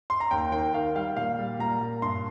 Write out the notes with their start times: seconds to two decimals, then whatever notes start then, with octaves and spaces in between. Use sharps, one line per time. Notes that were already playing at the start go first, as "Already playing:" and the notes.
0.10 C6
0.20 A#5
0.31 D#2 G5
0.52 D#3 G5
0.73 D#3 F5
0.95 G3 F5
1.17 A#2 F5
1.39 G3
1.59 A#2 A#5
1.81 A#2
2.02 G2 C6